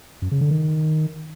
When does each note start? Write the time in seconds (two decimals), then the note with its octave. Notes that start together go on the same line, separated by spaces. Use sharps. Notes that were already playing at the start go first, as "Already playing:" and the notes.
0.22 F#2
0.31 C#3
0.41 D3
0.51 D#3